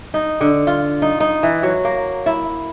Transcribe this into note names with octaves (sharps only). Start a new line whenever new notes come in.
D#4
D3
F4
D#4
D#4
E3
F#3
A#3
E4